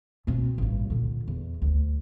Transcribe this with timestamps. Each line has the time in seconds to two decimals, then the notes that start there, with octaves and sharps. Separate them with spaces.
0.27 B2 C4
0.58 A1 G2
0.90 A#2 D3
1.28 E2
1.62 D2